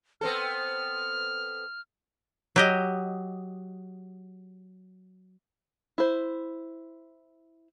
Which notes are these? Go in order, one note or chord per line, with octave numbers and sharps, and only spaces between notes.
B3 C4 A4 F6
F#3 G4 D#5
E4 C5